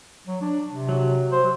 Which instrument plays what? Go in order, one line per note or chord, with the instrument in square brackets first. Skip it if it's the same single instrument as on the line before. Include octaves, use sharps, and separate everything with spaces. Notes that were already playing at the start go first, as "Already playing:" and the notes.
[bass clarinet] F#3
D4
C3
[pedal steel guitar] F#3
[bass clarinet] C5